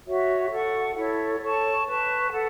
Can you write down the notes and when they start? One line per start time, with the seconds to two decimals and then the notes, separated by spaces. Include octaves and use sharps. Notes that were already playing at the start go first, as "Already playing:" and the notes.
0.06 F#4 C#5 E5
0.51 A4 F#5 C#6
0.96 E4 A4 C#5
1.41 A4 C#5 A5 C#6
1.86 B4 A5 C#6
2.31 A4 F#5